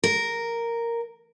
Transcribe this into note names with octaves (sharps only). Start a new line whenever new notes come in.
A#4